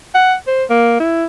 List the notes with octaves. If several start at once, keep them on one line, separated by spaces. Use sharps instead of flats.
F#5
C5
A#3
E4